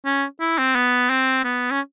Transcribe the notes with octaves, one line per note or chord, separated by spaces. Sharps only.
C#4
E4
C4
B3
C4
B3
C#4